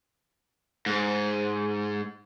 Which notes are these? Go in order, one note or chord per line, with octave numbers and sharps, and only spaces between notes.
G#2